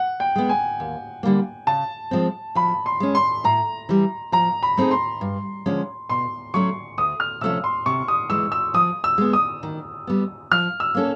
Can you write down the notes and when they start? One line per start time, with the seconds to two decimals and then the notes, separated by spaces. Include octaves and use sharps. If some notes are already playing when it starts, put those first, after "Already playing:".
Already playing: F#5
0.20 G5
0.36 G#3 B3
0.49 G#5
0.80 D#2
1.23 D3 G3 A#3
1.67 C#3 A5
2.11 F3 G#3 C4
2.55 F3 B5
2.86 C6
3.00 G#3 C#4
3.15 C6
3.44 A2 A#5
3.89 E3 G3
4.32 F3 A#5
4.63 B5
4.77 A3 C4 D#4 G#4
4.91 C6
5.21 G2
5.66 D3 F3 G#3 C#4
6.09 B2 C6
6.54 F#3 A3 C#4 C#6
6.98 D2 D#6
7.20 F6
7.41 C3 F3 A3 C#4 E6
7.64 C6
7.86 C3 C#6
8.08 D#6
8.30 E3 G#3 E6
8.52 E6
8.74 F3 D#6
9.04 E6
9.18 G#3 B3
9.33 D#6
9.63 D#3
10.07 G3 B3
10.51 F3 F6
10.80 E6
10.94 A#3 C#4 F#4 A4